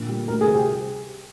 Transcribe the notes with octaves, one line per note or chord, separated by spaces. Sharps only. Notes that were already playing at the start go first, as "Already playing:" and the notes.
Already playing: A#2 D3
G3
D2 A#4
G#4
C3
G4